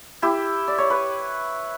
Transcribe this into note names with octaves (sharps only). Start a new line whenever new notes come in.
E4 G4
D5
C#5
B4